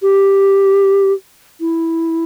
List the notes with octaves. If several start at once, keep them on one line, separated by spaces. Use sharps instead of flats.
G4
E4